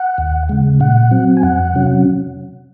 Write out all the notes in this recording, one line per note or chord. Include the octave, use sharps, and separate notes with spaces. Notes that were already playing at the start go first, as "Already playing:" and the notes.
Already playing: F#5
D#2
C#3 G#3
A#2 F#5
F#3 C4
G#5
F2 F#5
C3 F#3 C#4